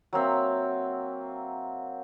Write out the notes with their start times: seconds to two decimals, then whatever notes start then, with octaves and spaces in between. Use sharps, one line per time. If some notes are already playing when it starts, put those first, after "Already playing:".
0.13 F#3 A#3 C4 E5